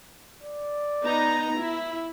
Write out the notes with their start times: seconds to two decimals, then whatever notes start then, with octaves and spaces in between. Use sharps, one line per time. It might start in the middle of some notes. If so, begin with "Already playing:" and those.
0.42 D5
1.03 B3 D#4 A#5
1.59 E4